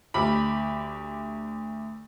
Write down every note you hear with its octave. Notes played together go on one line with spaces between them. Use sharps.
D2 G4 B5